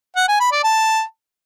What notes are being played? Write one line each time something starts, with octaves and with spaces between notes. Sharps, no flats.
F#5
G#5
B5
D5
A5